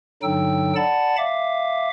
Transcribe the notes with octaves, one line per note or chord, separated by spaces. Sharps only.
G2 D3 F#3 D#4 G5 E6
D5 F#5 A5 B5 A6
E5 F5 D6